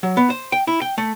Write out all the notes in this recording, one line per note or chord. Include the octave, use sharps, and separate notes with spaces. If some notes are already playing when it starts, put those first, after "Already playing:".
F#3
B3
C5
G5
E4
G5
A3